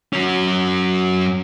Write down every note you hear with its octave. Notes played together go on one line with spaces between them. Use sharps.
F#3 C#4